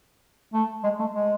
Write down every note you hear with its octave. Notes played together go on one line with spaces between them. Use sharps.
A3
G#3
A3
G#3